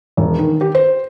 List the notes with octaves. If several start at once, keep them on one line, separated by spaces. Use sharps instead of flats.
E1
D#3
G4
C5